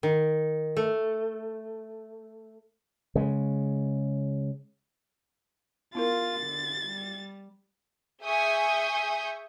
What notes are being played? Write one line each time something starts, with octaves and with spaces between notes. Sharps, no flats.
D#3
A3
C#3 G#3
B3 E4 F4 A#4 A6
D3
G3
G#4 E5 G#5 C#6 D#6 G6